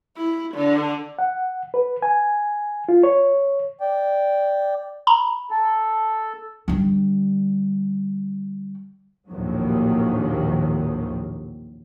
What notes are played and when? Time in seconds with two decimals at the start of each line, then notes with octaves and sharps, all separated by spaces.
0.17 E4
0.54 D3
1.19 F#5
1.74 B4
2.02 G#5
2.89 F4
3.03 C#5
3.80 D5 G5
5.07 A#5 B5
5.51 A4
6.68 D3 G3
9.29 A#1 D#2 A2 C3 D#3 F#3